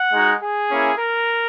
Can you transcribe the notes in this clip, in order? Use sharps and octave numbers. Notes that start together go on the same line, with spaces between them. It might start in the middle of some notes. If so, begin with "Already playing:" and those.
Already playing: F#5
G#3 D#4 F#4
G#4
A#3 C#4 E4
A#4